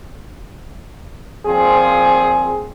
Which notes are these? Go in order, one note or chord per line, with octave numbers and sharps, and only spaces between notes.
A#2 F3 C4 G#4